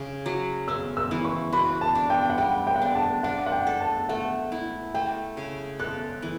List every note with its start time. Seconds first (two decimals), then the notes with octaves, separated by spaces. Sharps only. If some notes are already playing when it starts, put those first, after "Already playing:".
Already playing: C#3
0.26 F#3
0.68 C#4 E6
0.97 E6
1.11 E3
1.25 C#6
1.52 F#4 B5
1.81 A5
1.95 D4
2.10 G5
2.30 F#5
2.38 G3 G5
2.67 G5
2.76 F#5
2.82 D4 G5
2.95 A5
3.23 D4 F#5
3.46 F#5
3.52 G5
3.67 A4
3.81 A5
4.09 A3 F#5
4.52 E4
4.94 A3 G5
5.37 C#3
5.79 A4 F#6
6.22 E3